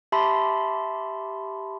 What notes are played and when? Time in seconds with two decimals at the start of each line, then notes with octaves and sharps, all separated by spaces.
0.12 G4 E5 A5 B5 C6